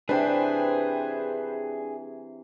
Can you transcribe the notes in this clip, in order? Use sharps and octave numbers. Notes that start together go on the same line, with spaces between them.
C3 E3 D4 G#4 B4 C5 G5